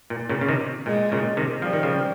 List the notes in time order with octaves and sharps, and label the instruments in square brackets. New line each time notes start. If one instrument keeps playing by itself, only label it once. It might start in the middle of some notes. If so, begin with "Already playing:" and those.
[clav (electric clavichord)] A#2
A#2 C#3
C#3
C3 D#3
[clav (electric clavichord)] A#2 [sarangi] G#3
[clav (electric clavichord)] A#2 C#3
C3 D#3
[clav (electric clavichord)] F3 [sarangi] G3
[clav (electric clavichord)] D#3
C#3 F3